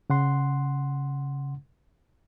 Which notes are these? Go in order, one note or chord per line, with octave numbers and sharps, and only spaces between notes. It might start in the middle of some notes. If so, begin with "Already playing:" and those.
C#3 F#5 C6